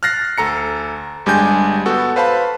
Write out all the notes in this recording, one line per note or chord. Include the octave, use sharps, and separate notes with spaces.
F6 F#6 A6 A#6 C7
D2 A4 A#5 C#7
G1 G3 G#3 D4 G#5 G6
B3 F#4 A4
B4 C5 F5 A5 B5